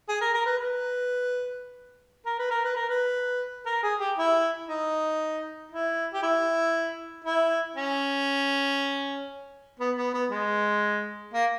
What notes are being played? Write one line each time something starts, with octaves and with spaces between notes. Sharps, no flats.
G#4
A#4
A#4
B4
B4
A#4
B4
A#4
B4
A#4
B4
A#4
G#4
G4
E4
D#4
E4
G4
E4
E4
C#4
B3
B3
B3
G#3
A#3